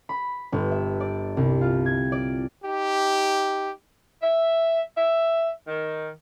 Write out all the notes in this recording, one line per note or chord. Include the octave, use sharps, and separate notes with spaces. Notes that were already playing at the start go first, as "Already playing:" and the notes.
B5
G1
E5
D5
C2
F4
G#6
D5
D#4 G4
E5
E5
D#3